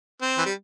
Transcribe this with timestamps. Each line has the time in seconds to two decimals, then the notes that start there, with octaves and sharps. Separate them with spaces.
0.22 C4
0.38 E3
0.46 G3